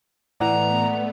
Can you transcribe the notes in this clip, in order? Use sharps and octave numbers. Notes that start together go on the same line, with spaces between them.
A2 E3 A3 B3 D5 F#5 A#5